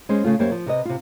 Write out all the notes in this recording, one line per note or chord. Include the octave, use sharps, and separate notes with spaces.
G#3 C#4 C5
C#3 A3 F4
F#2 A#3 G4 C5 C#5
F3
C3 B4 D#5
C3 F4